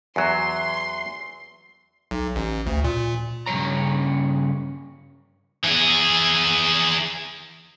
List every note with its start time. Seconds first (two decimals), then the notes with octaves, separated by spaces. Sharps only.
0.16 E2 F#3 C6
2.11 B1
2.36 A1
2.66 D2
2.84 A#2
3.46 G2 C#3 C#4 C#5 A#5
5.65 E3 G#4